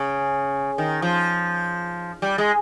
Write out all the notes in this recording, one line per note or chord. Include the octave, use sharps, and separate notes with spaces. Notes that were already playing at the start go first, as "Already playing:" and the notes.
Already playing: C#3
D#3
F3
G3
G#3